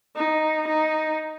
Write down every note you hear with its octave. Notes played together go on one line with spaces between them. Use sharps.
D#4
D#4